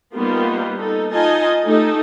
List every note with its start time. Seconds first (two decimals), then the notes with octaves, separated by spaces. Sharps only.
0.16 G3 A#3 B3 D#4 F4
0.77 D#4 A4
1.12 D#4 F4 D#5 G#5 A5
1.65 A3 D#4 G4 A4